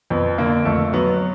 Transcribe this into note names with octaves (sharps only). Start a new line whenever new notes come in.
F2 B3
D3 A#3
F2 A3
F#3 B3